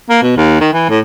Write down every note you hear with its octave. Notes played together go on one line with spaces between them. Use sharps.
A#3
B2
D#2
D#3
E3
A2